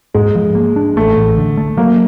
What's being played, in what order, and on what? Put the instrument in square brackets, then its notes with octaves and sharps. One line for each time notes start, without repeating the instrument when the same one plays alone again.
[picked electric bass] G#2 [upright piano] G#3
[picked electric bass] F3
A#3
D4
[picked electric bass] A1 [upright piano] A3
[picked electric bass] A1
D3
A3
[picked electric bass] F#3 [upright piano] A#3